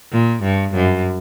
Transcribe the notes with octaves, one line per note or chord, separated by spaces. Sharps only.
A#2
G2
F#2